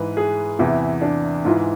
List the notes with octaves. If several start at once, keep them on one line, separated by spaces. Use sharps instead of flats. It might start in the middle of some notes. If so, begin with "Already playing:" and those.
Already playing: G#2 E3 B4
G#4
E2 C3 E3 E4
D4
G#2 E3 F4